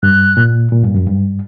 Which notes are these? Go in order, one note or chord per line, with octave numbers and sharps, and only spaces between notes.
G2 F#6
A#2
A#2
G2
F#2
G2